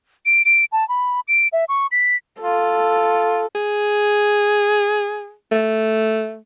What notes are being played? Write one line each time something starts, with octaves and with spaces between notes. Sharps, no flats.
D7
D7
A5
B5
D7
E5
C#6
B6
F4 A4
G#4
A3